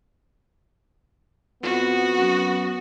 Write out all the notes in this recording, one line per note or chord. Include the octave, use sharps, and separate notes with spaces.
F2 B3 F#4
F#2